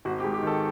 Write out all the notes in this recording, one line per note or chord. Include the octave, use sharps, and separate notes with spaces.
G#1 F#4
G4
G#2
G4
D#3 A4